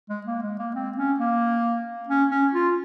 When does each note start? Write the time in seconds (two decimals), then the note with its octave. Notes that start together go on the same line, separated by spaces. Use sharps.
0.09 G#3
0.26 A#3
0.42 G#3
0.59 A#3
0.75 C4
0.97 C#4
1.19 A#3
2.08 C#4
2.31 C#4
2.53 F4